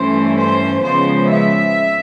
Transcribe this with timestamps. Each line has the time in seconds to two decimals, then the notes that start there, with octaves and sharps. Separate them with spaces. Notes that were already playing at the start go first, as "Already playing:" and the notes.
Already playing: G2 E3 A3 C#4 C5
0.37 C5
0.82 C#3 F3 G#3 B3 C5
1.29 E5